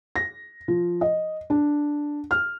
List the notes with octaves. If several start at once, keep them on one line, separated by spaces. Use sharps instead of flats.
A#6
F3
D#5
D4
F6